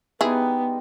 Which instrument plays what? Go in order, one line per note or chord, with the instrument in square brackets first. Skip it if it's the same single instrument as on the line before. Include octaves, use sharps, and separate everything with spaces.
[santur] G3 G#3 D#4 [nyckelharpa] B3 [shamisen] E4 G#4